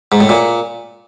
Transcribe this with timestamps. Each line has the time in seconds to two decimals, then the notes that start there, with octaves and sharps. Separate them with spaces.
0.12 G#2
0.21 A2
0.29 A#2